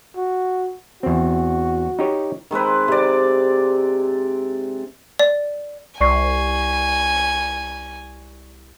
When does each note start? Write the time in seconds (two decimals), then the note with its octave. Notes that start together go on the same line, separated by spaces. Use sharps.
0.16 F#4
1.03 E2 C4 F#4
1.99 D#4 G4 C#5
2.51 D#3 G#3 C4 B4
2.88 C3 D5
5.19 D5
6.01 C2 D5 G#5 C#6 C7